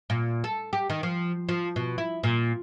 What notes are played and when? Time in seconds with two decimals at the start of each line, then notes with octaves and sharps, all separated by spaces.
0.10 A#2
0.44 A4
0.73 G4
0.90 D#3
1.03 F3
1.49 F3
1.76 B2
1.98 E4
2.23 A#2